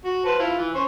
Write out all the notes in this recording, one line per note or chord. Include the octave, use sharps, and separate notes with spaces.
F#4
B4 C5 A5
E4 F4
E3
C#4 C5 C#5